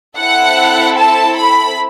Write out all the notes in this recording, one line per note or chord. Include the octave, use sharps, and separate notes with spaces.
C4 E4 A4 F#5
A5
B5